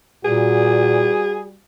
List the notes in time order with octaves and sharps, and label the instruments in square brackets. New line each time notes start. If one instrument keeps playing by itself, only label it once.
[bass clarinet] A#2 [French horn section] G3 F#4 [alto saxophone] G#4